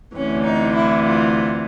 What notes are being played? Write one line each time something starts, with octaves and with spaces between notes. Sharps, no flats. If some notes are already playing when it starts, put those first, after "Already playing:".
D2 C3 E3 C#4
D#4
E4
F4